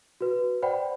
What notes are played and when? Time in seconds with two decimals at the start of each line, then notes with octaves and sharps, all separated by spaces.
0.21 F#4 B4
0.62 C5 D5 F#5 G5 B5